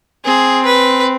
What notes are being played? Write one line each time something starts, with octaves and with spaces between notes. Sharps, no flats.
C4 G#4
B4